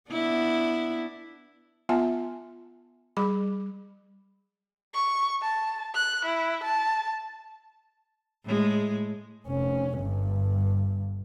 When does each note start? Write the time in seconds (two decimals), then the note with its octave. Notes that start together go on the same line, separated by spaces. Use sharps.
0.10 B3 D4 E4
1.89 B3 F4 E5 G#5 A5
3.17 G3 G#4 B5 D6
4.94 C#6
5.42 A5
5.95 F#6
6.26 E4
6.64 A5
8.44 A2 G#3
9.48 F1 C#4
9.99 G1 G2